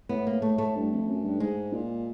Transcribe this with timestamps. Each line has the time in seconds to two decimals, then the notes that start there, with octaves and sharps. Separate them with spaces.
0.09 A2 B3
0.27 A#3
0.42 A3
0.58 A3
0.76 G2
0.92 F2
1.07 F#2
1.24 G2
1.40 G#2 G#3
1.73 A#2